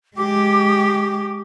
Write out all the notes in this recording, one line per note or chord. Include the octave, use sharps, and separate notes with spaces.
G#3 G4 D6